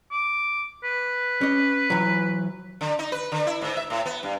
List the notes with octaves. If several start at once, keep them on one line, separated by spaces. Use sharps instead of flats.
D6
B4
C#4 D#5
E3 F#3
D3
D#4
B4
D3
E4
G#2
E5
A2
B3
G2